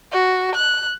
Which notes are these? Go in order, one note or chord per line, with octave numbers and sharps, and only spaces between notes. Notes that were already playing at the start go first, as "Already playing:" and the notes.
F#4
F#6